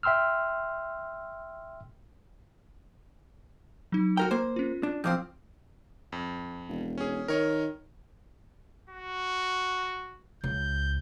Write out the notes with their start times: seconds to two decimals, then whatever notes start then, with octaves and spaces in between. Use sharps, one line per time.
0.03 E5 G5 C6 E6 F6
3.92 F#3 D#4
4.17 F#4 A#4 G5 A#5
4.31 A#3 C5
4.56 C#4 F4
4.83 D4
5.04 F2 F3 C4 F5 D6 G6
6.12 F2
6.69 E1
6.98 C#4 G#4
7.28 D#3 A#4 C#5 D#5
8.90 F#4
10.44 C#2 G6